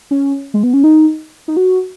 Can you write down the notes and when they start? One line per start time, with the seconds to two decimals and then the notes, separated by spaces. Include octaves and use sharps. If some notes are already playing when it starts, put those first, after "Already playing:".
0.11 C#4
0.54 G#3
0.63 B3
0.74 C#4
0.84 D#4
1.48 D#4
1.57 F#4